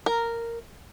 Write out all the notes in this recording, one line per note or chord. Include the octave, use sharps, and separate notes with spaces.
A#4